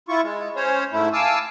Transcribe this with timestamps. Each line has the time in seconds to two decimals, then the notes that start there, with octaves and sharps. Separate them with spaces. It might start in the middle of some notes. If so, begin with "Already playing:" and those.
0.09 E4 F4 C#6
0.23 G#3
0.56 C#4 C5 C#5
0.92 G#2 A3 E4
1.13 F5 G#5 A5 D6 E6